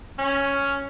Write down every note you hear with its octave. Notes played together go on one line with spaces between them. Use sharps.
C#4